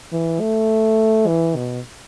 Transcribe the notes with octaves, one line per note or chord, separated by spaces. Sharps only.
E3
A3
E3
B2